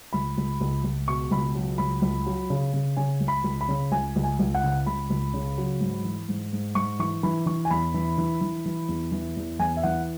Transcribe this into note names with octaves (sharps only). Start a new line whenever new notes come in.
C#2 B5
C#2
C#2
C#2
B2 C#6
C#2 B5
F#3
C#2 B5
C#2
F#3
C#3
C#3
C#3 G#5
C#2
B5
C#2
B5
C#3
C#2 G#5
C#2
G#5
C#2
F#5
C#3
C#2 B5
C#2
C#3
F#3
G#2
E3
G#2
G#2
G#2 C#6
E3 C#6
E3 B5
E3 C#6
G#5
E2 B5
E3
E3
E3
E3
E2
E3
E2
E2 G#5
E5
E3 F#5